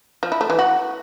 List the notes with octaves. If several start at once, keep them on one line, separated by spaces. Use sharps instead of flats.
F3
E4
A3
E3
F#4